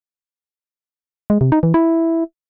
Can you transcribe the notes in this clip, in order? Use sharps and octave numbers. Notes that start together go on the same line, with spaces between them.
G#3
C3
D#4
E3
E4